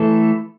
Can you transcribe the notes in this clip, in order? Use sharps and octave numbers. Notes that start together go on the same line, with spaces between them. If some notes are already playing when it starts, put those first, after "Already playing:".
Already playing: E3 A3 E4 A4